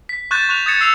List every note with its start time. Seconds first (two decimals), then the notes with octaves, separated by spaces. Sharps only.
0.09 B6
0.31 C#6 F#6 G6 A6 E7
0.49 C#6 F#6 F7
0.66 D#6 G#6 A6 C#7 E7
0.81 E6 C7 C#7 F7